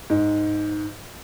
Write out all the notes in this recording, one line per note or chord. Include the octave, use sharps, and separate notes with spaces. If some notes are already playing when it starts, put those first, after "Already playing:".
G#2